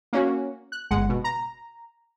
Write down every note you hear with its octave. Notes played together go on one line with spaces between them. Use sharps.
A#3 C#4 F#4
F#6
G1 G#3 F#5
B2
A#5